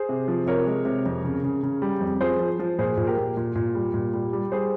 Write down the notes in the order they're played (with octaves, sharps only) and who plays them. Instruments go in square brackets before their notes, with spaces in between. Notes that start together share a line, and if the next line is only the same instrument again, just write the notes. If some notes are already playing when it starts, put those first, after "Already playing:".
Already playing: [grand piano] G#4 C5
C3
F3
C3 A#4 C#5
G#3
C3
F2
C#3
C#3
C#3
G3
F2
F3 G#4 C5
F3
F3
A#2 G#4 C5
A#2
G4 A#4
A#2
A#2
A#2
G3
A#2
G3
G3
G#4 C5